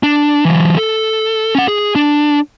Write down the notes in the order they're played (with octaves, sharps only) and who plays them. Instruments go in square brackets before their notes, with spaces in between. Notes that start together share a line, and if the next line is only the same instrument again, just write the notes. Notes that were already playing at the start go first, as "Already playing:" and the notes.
[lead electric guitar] D4
E3 F#3
A4
C#4 F#5
G#4
D4